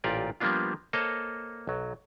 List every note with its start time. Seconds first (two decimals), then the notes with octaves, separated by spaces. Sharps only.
0.04 A1 A#2 F4 G4 A#4 D5
0.40 F3 G3 A#3 B3 D4 F4
0.93 A#3 A4 C5 C#5 D#5 A5
1.67 B1 F#3